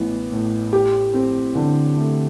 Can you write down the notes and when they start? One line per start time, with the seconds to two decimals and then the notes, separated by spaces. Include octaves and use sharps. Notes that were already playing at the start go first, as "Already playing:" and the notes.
Already playing: A1 E3 B3
0.32 A2
0.73 G4
1.13 C4
1.55 D3
1.97 A3